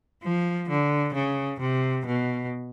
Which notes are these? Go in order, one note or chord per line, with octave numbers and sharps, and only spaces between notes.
F3
D3
C#3
C3
B2